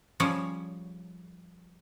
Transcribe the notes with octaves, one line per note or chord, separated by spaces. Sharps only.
F3 G3 C#4 G#4 C#5